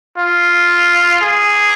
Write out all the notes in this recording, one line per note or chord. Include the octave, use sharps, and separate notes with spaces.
F4
G#4